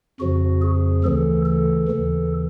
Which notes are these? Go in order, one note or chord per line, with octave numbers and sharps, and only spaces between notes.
F2 C#3 F3 F#4
G#4
D2 C#3 E3 A4
A4
D#2 C#3 E3